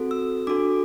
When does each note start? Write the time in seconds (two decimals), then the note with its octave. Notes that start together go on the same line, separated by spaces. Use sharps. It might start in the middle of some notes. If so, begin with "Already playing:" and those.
Already playing: C4 F#4 A4
0.11 E6
0.47 D4 F#4 A4 D6